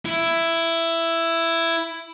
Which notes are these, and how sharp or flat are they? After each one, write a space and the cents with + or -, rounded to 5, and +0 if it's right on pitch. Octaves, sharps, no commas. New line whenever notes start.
E4 +10